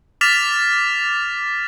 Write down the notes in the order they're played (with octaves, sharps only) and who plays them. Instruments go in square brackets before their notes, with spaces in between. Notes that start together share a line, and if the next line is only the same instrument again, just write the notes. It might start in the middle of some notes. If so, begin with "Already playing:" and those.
[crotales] D6 F6 A6 B6 E7 F7